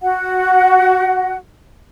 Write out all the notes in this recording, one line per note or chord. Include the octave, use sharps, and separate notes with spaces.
F#4 F#5